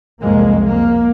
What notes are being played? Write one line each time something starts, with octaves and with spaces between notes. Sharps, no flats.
C2 F2 G#3 A#3
A#3